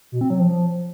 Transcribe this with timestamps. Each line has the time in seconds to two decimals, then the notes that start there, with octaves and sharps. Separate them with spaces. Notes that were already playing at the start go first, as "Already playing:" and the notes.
0.12 B2
0.21 C4
0.30 F#3
0.39 F3